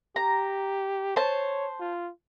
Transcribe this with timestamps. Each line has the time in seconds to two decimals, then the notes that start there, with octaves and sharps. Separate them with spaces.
0.16 G4 A#5
1.16 C5 C#5 A5
1.80 F4